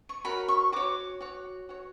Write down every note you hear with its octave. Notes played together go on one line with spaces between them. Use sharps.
C#6
F#4 A#4 C#5 B5
C#6
F#4 C#5 D6
F#4 C#5
F#4 C#5